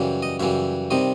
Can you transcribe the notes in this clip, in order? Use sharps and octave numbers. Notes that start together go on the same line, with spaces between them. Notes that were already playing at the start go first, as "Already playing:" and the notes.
Already playing: F#2 C#3 E3 G3
D#5
F#2 C#3 E3 G3 E5
C3 D#3 G3 D#5